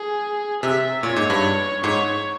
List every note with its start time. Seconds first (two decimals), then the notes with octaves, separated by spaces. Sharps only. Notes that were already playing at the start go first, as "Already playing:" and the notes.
Already playing: G#4
0.63 C3 E5
1.03 A#2 C#5
1.16 G#2
1.30 G2
1.84 G#2 C#5